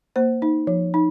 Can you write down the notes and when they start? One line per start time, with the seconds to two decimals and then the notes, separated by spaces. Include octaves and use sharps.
0.16 A#3 C5
0.42 D#4
0.67 F3
0.94 D#4